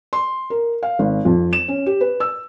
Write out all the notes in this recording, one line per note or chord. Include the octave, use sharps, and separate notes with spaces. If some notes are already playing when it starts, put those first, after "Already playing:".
C6
A#4
F5
G#1
F2
E7
C#4
G4
B4
E6